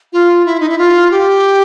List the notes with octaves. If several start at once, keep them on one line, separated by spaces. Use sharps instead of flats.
F4
E4
D#4
E4
F4
G4